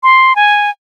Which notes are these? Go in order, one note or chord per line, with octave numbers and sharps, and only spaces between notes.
C6
G#5